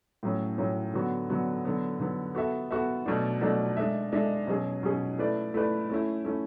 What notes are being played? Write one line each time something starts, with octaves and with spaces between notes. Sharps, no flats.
A2 F#3 C#4
A2 F#3 C#4
D3 F#3 B3 F#4
D3 F#3 B3 F#4
D3 F#3 B3
D3 F#3 B3
B3 F#4 A4 E5
B3 F#4 A4 E5
B2 F#3 A3 D4
B2 F#3 A3 D4
G#3 D4 A4 E5
G#3 D4 A4 E5
B2 F#3 C#4 G#4
B2 F#3 C#4 G#4
A3 E4 B4 D5
A3 E4 B4 D5
A3 C#4 E4
A3 C#4 E4